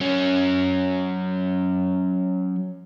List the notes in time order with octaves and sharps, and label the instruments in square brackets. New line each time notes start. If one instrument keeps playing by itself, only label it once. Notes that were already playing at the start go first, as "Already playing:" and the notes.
[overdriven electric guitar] F#3 C#4